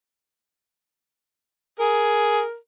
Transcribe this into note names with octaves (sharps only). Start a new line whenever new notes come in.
G#4 A#4